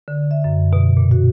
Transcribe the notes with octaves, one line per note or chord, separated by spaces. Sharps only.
D3
E5
F#2
B2
A#2
F#4